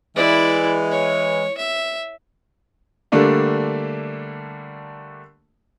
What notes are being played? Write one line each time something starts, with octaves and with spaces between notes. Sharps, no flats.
E3 G#3 E4 D5
C#5
E5
D3 G3 A3 A#3 D4